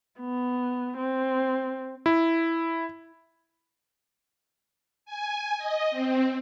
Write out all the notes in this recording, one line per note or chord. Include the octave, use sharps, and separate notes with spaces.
B3
C4
E4
G#5
D#5
C4